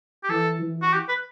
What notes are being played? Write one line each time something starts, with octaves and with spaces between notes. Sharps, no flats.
G4
E3 A4
E3
F#4
G4
B4